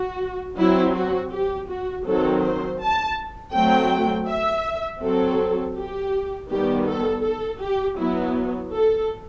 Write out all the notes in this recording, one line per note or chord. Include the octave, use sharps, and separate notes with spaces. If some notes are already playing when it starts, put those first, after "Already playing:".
Already playing: F#4
F#3 C4 E4
F#4
G4
F#4
D#3 F#3 C4 A4
C5
A5
F#3 A3 C4 G5
E5
F#3 C4 A4
G4
D#3 G3 B3 G4
A4
A4
G4
F#3 B3 E4
A4